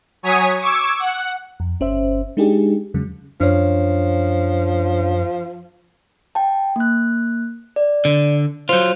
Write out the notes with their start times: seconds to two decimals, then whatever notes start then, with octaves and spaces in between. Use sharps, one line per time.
0.23 F#3 C#5 G#5 D#6 B6 D#7
0.61 C#6 D6 E6 G#6
1.00 F#5
1.60 F2
1.80 G1 C#4 C5 E5
2.37 G#3 D4 D#4 G4 G#4
2.94 E2 C#3 F#3 G#3
3.40 F#2 F3 D4 C#5
6.35 G5 A5
6.76 A#3 F#6
7.76 D5
8.05 D3
8.69 F#3 F4 C5 G6